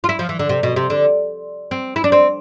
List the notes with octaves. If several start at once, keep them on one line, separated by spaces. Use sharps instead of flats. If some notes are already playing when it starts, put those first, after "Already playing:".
F4
E4
F3
E3
D3
C3
B2
C3
D3
C4
E4
D4
C4